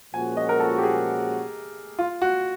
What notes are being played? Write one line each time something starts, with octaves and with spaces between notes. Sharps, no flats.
A#2 F3 G#3 C#4 F#4 G#5
D#5
A#4
A4
G4
G#4
F4
F#4